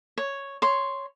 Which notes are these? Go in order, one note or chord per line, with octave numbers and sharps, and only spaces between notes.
C#5
C#5 C6